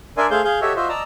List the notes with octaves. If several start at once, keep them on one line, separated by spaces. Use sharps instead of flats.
D4 A#4 D5 E5 G#5 C6
A3 G#4 C5 F5 G6
G#4 F5 G6
F#4 G4 A4 C#5 D#5 E5
F4 F#4 C5 D#5 E5
D5 D#5 A5 A#5 E6